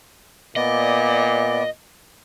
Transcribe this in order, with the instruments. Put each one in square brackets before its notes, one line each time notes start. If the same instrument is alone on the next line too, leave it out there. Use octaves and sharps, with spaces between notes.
[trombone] A#2 [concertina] B3 D5 [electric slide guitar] D#5